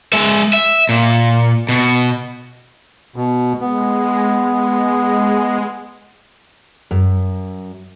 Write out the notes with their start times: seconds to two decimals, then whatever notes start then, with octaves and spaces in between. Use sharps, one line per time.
0.13 G#3 E5
0.53 E5
0.89 A#2
1.69 B2
3.16 B2
3.61 G#3 B3
4.52 G#3
6.91 F#2